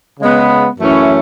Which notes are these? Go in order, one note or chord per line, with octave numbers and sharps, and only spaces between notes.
C#3 G#3 B3
F#2 E3 A3 C#4 E4